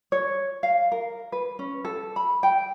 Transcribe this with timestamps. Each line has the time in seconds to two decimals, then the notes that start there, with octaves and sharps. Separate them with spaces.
0.12 C#5
0.63 F5
0.92 A#4
1.32 B4
1.59 C#4
1.85 A4
2.16 B5
2.43 G5